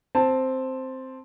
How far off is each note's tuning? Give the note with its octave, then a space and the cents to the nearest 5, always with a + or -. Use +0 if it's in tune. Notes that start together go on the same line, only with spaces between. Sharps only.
C4 +0 A5 +0